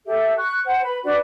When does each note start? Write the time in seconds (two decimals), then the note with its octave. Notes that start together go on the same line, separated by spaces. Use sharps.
0.06 G4 A4 E5
0.37 C#6 F#6
0.64 C5 F#5
0.83 B4 B5
1.03 D4 F#4 B4 D5